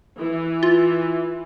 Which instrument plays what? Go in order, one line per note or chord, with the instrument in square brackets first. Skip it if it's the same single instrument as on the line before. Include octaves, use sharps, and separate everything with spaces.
[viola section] E3
[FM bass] F4